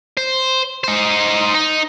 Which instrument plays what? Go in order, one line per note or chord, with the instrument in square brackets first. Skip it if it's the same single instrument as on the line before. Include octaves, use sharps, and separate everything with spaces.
[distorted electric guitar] C5
D#4 C5
D#4